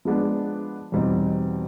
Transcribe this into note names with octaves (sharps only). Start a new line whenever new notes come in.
F3 G#3 B3 D4
E2 B2 G3 C4 D#4